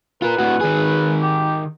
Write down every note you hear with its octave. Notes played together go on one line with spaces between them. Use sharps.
F4 A#4 B4
A2 F#4
D#3 G#4
G4